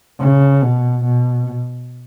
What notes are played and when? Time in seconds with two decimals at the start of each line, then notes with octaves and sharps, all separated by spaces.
0.20 C#3
0.62 B2
1.04 B2